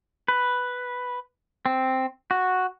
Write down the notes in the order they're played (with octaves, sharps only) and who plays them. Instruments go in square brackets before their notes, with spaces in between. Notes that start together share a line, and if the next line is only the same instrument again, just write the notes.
[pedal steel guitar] B4
C4
F#4